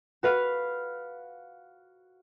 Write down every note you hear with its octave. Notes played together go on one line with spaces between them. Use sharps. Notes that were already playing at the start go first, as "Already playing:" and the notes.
F#4 B4 F5